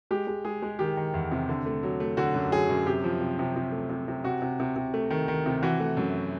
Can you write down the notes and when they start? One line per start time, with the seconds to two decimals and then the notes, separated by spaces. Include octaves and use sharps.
0.11 G#3 G4
0.27 G#3
0.45 G#3 G#4
0.62 G#3
0.79 D#3 G4
0.97 D#3
1.14 E2
1.32 C3
1.49 D3
1.66 A3
1.83 F#3
2.00 A3
2.17 D3 F#4
2.34 F#2
2.52 F#3 G#4
2.70 F#2
2.86 C3 G4
3.04 F3
3.21 C3
3.39 C3
3.56 C3
3.72 A3
3.89 C3
4.08 C3
4.24 C3 F#4
4.42 C3
4.60 C3
4.76 C3
4.94 A3
5.10 D#3
5.28 D#3
5.46 C3
5.63 E3 F#4
5.80 A3
5.97 F#2